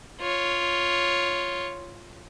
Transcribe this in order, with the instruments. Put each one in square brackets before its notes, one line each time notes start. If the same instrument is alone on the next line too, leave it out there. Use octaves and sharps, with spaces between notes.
[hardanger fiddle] F4 C#5